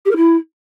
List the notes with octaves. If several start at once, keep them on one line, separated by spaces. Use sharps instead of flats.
G4
A#4
E4